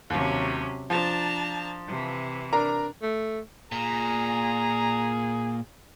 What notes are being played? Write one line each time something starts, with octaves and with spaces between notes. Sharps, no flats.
D#2 C3 F#3 C#4
F3 D4 A5 A#5
C3 E3
D4 A#4 A#5
A3
A#2 G#4 A#5